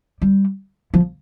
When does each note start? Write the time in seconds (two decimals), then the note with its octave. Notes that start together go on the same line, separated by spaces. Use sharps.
0.22 G3
0.94 F3